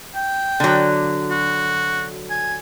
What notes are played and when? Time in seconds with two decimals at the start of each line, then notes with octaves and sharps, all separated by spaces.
0.15 G5
0.60 D3 F#3
1.30 F#4
2.30 G#5